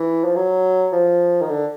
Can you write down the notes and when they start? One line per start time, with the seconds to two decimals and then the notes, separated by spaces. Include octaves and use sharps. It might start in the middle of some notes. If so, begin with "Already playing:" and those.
Already playing: E3
0.25 F3
0.36 F#3
0.93 F3
1.42 D#3
1.50 D3